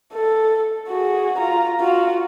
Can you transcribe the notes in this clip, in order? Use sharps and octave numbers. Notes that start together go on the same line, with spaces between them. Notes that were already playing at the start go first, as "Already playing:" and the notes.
A4
F#4 G#4
F4 A#5
F4 F#4